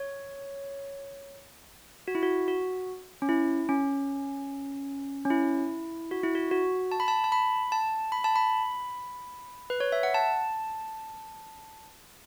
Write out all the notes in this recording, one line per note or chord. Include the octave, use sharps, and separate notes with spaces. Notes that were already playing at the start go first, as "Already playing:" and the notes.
Already playing: C#5
F#4
E4
F#4
F#4
C#4
E4
C#4
C#4
E4
F#4
E4
F#4
F#4
A5
B5
A5
A5
B5
A5
B5
A5
B5
B4
C#5
E5
F#5
A5